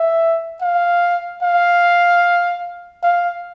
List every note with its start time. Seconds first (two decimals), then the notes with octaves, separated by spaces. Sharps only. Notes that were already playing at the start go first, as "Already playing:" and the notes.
Already playing: E5
0.61 F5
1.43 F5
3.03 F5